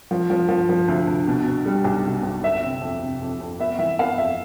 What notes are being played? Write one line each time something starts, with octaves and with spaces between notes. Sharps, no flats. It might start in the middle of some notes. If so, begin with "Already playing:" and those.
F3
F3
F3
F3
D2
D2
B2
B2
G3
B1
B2
B1
G1 E5
C3
F2
C3
F2
F2
B3 E5
E3 E5
B3 F5
F2 E5